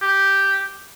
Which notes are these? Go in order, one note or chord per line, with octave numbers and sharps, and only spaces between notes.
G4